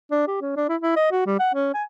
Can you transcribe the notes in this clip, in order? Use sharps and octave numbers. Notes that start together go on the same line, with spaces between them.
D4
G4
C#4
D4
E4
E4
D#5
F#4
G3
F#5
C#4
G#5